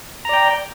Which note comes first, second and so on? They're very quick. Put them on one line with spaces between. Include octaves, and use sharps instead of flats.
A#5 D5 G5